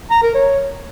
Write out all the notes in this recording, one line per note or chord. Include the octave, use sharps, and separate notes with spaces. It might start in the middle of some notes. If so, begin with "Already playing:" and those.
A#5
A#4
C#5